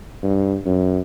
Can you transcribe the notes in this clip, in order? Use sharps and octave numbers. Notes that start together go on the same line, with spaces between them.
G2
F#2